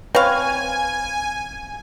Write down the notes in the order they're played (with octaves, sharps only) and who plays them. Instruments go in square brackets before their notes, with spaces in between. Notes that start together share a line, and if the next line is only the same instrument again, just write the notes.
[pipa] C4 F5 [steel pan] B4 C#5 F#5 [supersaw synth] G#5